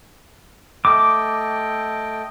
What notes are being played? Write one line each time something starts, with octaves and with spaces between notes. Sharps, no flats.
A3 D#5 G5 D6